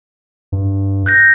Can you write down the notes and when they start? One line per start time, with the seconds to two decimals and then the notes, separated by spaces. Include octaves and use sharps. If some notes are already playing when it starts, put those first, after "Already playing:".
0.52 G2
1.06 F#6 G6 A#6